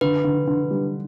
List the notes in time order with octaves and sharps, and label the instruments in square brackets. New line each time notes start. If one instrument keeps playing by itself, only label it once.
[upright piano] D3 [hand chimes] B4
[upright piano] D3
D3
G3